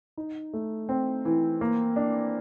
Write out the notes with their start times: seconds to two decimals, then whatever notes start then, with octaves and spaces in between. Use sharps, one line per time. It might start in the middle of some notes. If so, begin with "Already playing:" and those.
0.17 D#4
0.53 A3
0.89 C4
1.25 E3
1.61 A#3
1.96 D4